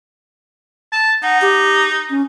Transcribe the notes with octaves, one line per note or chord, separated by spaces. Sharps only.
A5
D#4 F#5
G4
C#4